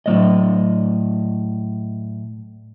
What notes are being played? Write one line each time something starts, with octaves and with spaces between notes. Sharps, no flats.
A2 F#3 G#3 D5 D#5